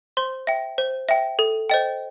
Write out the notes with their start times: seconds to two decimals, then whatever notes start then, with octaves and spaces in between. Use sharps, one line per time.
0.17 C5 C6
0.47 E5 G5
0.78 C5
1.09 E5 G5
1.39 A4
1.70 C5 D#5 G5